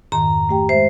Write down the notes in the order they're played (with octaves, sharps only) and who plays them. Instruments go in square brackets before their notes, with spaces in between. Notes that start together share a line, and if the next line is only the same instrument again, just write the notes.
[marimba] F2 G#2 D#3 [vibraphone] A#5
[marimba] A3 G4 G5
[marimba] G#3 E5 [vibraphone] C5